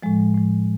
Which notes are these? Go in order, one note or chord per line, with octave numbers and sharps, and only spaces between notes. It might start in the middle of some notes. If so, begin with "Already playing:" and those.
A2 F3 G#3
A2 F3